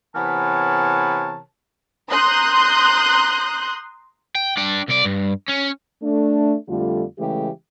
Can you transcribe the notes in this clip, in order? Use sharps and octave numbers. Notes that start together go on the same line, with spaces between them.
C3 E3 B3 A#4 C#5 A5
A#5 C6 D#6 F#6 G6
G5
D4 G5
C2 D5
G2
C#4
A3 D4
F2 D3 G3 A3 F4
C#3 E3 G#3 A3 G4